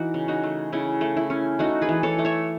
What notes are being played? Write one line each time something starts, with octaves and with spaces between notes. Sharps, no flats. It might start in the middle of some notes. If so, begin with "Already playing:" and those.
Already playing: E3 D#4 F#4
C#3
D#4 F#4
A3
C#3 E4
A3
E4
C#4
A3 D#4 F#4
G#4 B4
E3
A4 C#5
A3
C#5 E5